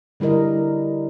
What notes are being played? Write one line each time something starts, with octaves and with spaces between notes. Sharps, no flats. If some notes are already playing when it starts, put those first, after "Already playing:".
D3 G3 E4 A#4 D#5